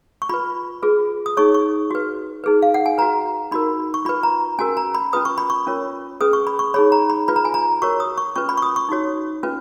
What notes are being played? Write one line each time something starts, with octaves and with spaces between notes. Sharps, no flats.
C#6
F4 B4 B5
F4 G#4 B4
D#6
D#4 G#4 C#5 C#6
C#6
F#4 B4
D#4 G#4 B4
F5
F#5
G#5
F#4 B4 A#5
D#4 F#4 A#4 B5
C#6
F4 B4 B5
A#5
C#4 F#4 A#4 G#5
A#5
B5
C#4 F4 B4 D#6
C#6
B5
C#6
C#4 F4 A#4 C#5
C#4 G#4 B4 D#6
C#6
B5
C#6
D#4 G#4 C#5 B5
A#5
B5
F4 B4 B5
A#5
G#5
A#5
F#4 A#4 C#5 C#6
D#6
C#6
C#4 F4 B4 C#6
B5
C#6
D#6
C#6
D#4 F#4 C#5
C#4 F4 B4